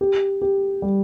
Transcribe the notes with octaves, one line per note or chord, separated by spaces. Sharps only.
G4
G4
G3